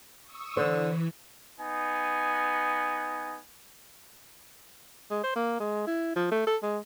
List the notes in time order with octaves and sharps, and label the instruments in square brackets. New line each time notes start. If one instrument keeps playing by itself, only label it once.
[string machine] C#6 D#6 E6
[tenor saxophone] D3 [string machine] E3 [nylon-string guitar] C5
[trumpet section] B3 D#4 G#5
[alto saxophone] G#3
C5
A#3
G#3
E4
F3
A3
A4
G#3